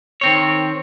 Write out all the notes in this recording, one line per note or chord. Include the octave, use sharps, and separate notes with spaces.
D#3 C4 C#5